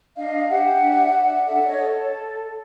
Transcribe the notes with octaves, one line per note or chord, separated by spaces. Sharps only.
D4 D#5 F5
G4 E5 F#5
D4
D4
A4 E5 F#5
D5
C#5 D#5
A4